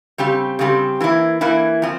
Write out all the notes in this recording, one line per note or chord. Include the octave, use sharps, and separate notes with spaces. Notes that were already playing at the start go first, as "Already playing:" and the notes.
C#3 G3 C4 G4
C#3 G3 C4 G4
E3 A#3 E4
E3 A#3 E4
F3 C4